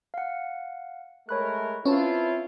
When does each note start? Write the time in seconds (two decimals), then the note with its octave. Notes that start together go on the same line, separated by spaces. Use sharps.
0.14 F5 F#5
1.29 G#3 A3 A#4 C#5 B5 F#6
1.85 C4 C#4 E4 F4 B4 A5